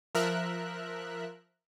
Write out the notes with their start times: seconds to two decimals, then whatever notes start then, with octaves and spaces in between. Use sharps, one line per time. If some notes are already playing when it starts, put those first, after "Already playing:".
0.15 F3 A#4 E5 F#6